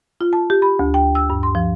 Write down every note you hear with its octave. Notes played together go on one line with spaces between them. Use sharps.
F4
A5
G4
B5
D2
G5
E6
G2
C6
F3